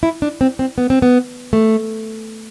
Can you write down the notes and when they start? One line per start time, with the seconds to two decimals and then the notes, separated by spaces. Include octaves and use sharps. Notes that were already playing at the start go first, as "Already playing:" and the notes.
0.03 E4
0.22 D4
0.41 C4
0.59 C4
0.78 B3
0.90 C4
1.02 B3
1.53 A3